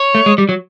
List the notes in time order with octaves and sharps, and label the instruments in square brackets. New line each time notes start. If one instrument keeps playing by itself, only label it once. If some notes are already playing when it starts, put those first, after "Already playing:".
Already playing: [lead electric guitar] C#5
[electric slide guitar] A3
G#3
G3
F#3